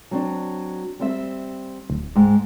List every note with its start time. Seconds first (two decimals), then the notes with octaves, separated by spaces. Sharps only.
0.11 F#3 C4 D4
0.99 G3 C4 E5
1.90 D1
2.15 G#2 G#3 G5